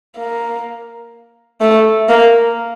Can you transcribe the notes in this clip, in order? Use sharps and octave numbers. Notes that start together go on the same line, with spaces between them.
A#3
A3
A#3